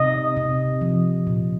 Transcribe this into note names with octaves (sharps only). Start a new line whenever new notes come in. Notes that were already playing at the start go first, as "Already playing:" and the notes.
Already playing: C3 D#5
C3
F3
A#2